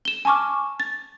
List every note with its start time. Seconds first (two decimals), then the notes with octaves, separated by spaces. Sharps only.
0.05 E7 G7
0.25 G#5 A5 C#6 D6 F6
0.80 A6